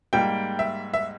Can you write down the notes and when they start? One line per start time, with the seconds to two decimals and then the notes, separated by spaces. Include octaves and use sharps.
0.13 G#2 G3 A#3 G5
0.59 E5
0.94 E5